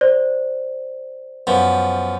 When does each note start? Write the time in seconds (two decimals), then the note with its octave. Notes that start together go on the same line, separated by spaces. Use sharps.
0.01 C5 D5
1.47 F#2 F3 B3